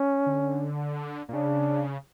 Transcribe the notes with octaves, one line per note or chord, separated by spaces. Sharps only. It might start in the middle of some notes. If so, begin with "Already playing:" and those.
Already playing: C#4
D3
A#2
C#3 D4